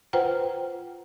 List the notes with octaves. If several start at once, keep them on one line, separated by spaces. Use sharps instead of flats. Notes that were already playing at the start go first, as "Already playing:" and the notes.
F4 B4 C5 F#5 G5 A#5